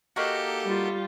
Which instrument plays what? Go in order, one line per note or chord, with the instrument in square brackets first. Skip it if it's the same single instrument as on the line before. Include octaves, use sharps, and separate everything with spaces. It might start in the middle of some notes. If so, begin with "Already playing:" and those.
[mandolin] A#3 D#4 F#4 [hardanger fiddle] G4 A4
[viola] G3 F4